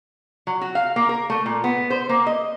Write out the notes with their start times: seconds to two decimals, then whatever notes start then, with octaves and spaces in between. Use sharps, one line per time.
0.47 F#3
0.61 F#4
0.75 F5
0.96 A#3
1.09 A#4
1.30 A3
1.46 A#2
1.64 B3
1.90 C5
2.09 A#3
2.27 D#5